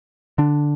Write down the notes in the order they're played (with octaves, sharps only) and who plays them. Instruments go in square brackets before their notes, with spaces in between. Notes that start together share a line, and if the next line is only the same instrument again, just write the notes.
[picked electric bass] D3 D4